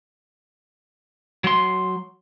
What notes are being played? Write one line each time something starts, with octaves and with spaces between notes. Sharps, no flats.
F#3 C6